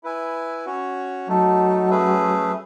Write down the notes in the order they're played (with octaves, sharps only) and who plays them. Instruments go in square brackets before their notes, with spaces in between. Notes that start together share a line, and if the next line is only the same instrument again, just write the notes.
[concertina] E4 B4 E5 G#5
C#4 F#4 C#5
[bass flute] F#3 [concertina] A3 D#4 A4
[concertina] A3 C#4 G#4 B4 E5